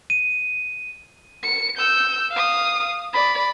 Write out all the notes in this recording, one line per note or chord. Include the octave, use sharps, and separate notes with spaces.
D#7
C#7
E6 G6
F5 D#6
D5 B5